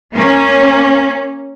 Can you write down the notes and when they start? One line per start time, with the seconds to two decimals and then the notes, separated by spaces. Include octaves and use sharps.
0.15 A#3 C#4